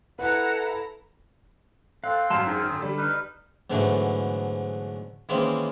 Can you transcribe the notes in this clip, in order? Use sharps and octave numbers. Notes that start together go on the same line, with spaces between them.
E4 A4 B4 F#5 A#5
C4 A4 F5 F#6
G#1 F#2 F5 A5 C6 F6
D#4 G#4
D3 D#6
G3 B5
D#4 B4 F6
G#2 B2 D3 E3 F#3 A3
D#3 E3 G#3 A#3 C4 C#4